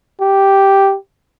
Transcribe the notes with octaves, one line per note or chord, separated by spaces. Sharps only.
G4